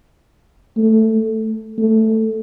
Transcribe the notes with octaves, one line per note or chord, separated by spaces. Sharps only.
A3
A3